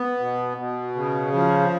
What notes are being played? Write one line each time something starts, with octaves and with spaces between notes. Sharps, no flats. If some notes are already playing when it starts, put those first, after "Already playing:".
Already playing: B3
B2
B2
C#3
F3